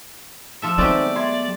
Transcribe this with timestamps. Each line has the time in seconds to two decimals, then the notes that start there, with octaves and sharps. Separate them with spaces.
0.62 F3 A4 E5
0.78 D#3 F#3 G#3 A3 B3 C4 G4 D5
1.15 E5 C6 G#6